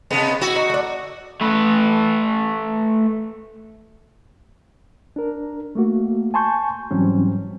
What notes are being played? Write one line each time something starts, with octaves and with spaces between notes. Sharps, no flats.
C3 G#3 B3
E4 F#4
D#4
A3 D4
A3 B4
D4 A#4
A3 A#3 F#4
G#5 A5 C6 C#6 G6
G#2 E3 F#3 G3 C4 C#4